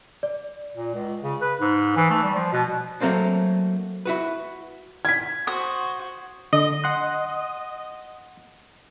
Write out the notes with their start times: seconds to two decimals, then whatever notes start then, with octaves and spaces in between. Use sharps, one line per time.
0.23 D5
0.75 A#2
0.95 C#2
1.23 C#3
1.41 B4
1.60 G#2
1.96 E3
2.10 A3
2.23 G3
2.35 F3
2.53 B2
3.01 F#3 A3 A#3 C4 D4
4.05 E4 F#4 B4
5.05 G#6 B6
5.47 F#4 C5 D#6
6.53 D3 D#5
6.84 F#5 C6 F#6